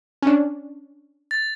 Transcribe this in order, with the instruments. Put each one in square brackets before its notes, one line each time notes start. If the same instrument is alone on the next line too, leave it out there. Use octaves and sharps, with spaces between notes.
[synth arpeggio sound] C#4 D4
[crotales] A6